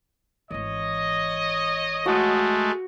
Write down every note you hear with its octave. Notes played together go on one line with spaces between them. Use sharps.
G#1 E3 C#5 D#5
G#3 A3 F#4